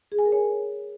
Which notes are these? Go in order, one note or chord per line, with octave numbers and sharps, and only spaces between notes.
G#4
G#5
A#4
C#5